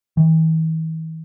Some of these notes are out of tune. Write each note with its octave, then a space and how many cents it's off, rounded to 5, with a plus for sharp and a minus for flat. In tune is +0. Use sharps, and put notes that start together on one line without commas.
E3 -45